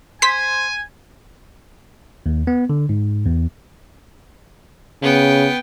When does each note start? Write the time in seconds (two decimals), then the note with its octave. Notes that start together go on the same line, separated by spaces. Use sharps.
0.22 C5 G#5 B6
2.26 D#2
2.47 B3
2.70 D3
2.89 G#2
3.26 E2
5.02 C#3 B3 G5